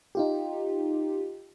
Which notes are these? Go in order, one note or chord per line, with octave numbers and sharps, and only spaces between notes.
D#4 F4 G4